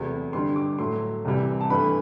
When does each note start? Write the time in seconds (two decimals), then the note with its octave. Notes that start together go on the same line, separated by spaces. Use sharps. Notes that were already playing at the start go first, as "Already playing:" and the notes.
Already playing: E2 C3 F#3 A3 B5
0.33 G2 D3 G3 C6
0.56 D6
0.78 A2 F#3 A3 C6
1.25 C2 C3 E3 G3
1.61 A5
1.70 G2 E3 A3 B5